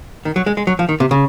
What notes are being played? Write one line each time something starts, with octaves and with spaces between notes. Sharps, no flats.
D#3
F#3
G#3
G#3
F#3
F3
D#3
C3
C#3